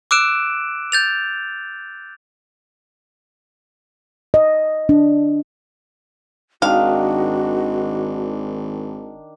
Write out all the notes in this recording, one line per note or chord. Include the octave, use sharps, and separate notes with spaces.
D6 E6 F#6 D7 E7
G6 A6 F7
D#5
D4
G#1 D#3 D4 F#4 F5